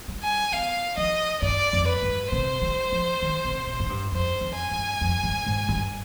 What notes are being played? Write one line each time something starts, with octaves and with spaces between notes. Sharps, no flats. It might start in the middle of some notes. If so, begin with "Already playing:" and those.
G3
G#5
B3 F5
F3 D#5
G2 D5
F2
B4
G2
C3 C5
G3
F3
D#3
C3
B2
G#2
G2
F2 C5
F2
G#5
G2
F2
G2
G#2
G2